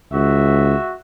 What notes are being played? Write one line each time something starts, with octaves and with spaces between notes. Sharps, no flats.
C#2 F#4 E5